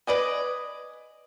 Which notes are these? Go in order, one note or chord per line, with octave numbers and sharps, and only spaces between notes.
B4 D5 D#5 G#5